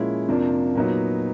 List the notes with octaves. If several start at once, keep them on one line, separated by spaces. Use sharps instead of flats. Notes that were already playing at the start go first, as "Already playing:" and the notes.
Already playing: A#2 F3 G#3 C#4 E4
F2 C3 F3 A#3 D4
A#2 F#3 B3 D#4